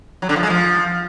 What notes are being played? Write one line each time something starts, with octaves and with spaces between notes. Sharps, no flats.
F#3
D3
F3
G#3
F3